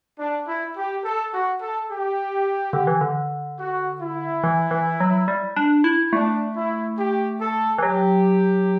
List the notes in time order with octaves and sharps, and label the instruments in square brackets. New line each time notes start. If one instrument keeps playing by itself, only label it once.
[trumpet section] D4
E4
G4
A4
F#4
A4
G4
[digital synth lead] D3
E3
D3
[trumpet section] F#4
E4
[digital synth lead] E3
E3
F#3
G3
D4
E4
[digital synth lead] A3 [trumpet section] D4
[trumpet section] E4
G4
A4
[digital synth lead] E3
[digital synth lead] F#3 [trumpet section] G4